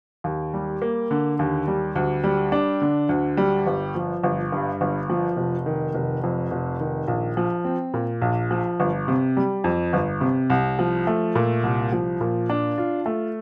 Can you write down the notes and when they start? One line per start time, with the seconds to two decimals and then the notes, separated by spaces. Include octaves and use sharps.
0.24 D#2
0.54 G3
0.82 A#3
1.11 D3
1.39 D#2
1.68 G3
1.96 D2
2.24 G3
2.52 D4
2.82 D3
3.09 D2
3.37 G3
3.67 G1
3.95 F3
4.24 G1
4.52 G2
4.81 G1
5.10 F3
5.37 F1
5.66 D#3
5.95 F1
6.23 F2
6.51 F1
6.80 D#3
7.08 A#1
7.37 F3
7.65 C4
7.94 A#2
8.22 A#1
8.51 F3
8.80 G1
9.08 C3
9.37 G3
9.64 F2
9.93 G1
10.21 C3
10.50 C2
10.79 F3
11.07 A3
11.35 A#2
11.63 C2
11.92 F3
12.21 A#2
12.50 D4
12.78 F4
13.06 A3